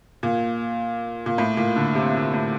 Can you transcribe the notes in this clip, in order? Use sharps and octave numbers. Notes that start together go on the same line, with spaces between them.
A#2
A#2
A2
A#2
D3
C3
A#2
A2